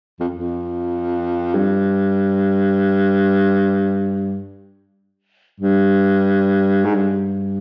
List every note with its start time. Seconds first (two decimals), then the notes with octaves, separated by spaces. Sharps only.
0.20 F2
0.34 F2
1.54 G2
5.60 G2
6.85 G#2
6.95 G2